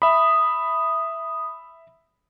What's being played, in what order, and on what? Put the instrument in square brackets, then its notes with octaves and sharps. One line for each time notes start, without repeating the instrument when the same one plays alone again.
[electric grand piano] E5 B5 [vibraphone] D#6